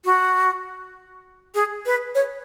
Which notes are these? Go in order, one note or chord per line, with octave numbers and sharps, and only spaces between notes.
F#4
G#4
B4
C#5